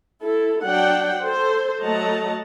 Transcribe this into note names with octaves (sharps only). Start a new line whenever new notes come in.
E4 A4
F#3 D4 F#5 G5
A4 C5
F#3 A3 D#5 F#5 A5 A#5